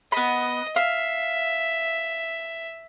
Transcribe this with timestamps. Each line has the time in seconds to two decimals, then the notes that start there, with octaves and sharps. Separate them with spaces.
0.12 B3 D#5 B5
0.76 E5 F5